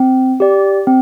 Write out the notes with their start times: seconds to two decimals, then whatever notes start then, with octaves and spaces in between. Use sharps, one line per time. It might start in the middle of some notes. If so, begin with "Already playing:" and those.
Already playing: C4
0.40 G4 D5
0.87 C4